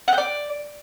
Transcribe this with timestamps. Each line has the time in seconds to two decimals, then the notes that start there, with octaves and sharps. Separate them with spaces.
0.08 F#5
0.13 G5
0.18 D5